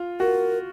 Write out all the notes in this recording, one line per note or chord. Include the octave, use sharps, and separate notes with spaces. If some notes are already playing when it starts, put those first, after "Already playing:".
Already playing: F4
F#4 A#4